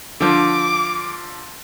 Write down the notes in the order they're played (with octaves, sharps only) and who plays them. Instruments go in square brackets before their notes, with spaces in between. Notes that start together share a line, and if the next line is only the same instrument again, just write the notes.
[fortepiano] D3 F3 [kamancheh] D6